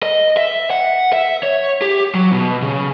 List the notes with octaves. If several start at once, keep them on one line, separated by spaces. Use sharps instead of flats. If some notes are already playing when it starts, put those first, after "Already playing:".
D#5
E5
F#5
E5
C#5
G4
F#3
B2
C#3